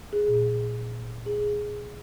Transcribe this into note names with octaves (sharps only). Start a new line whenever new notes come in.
G#4
A#2
G#4